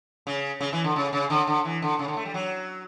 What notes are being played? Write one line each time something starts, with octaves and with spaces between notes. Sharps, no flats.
C#3
C#3
E3
D3
C#3
C#3
D3
D3
E3
D3
C#3
D3
A3
G3
F#3